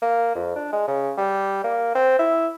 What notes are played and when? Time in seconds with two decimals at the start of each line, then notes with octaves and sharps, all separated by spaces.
0.02 A#3
0.35 F2
0.56 D4
0.73 G#3
0.87 C#3
1.17 G3
1.64 A#3
1.95 C4
2.19 E4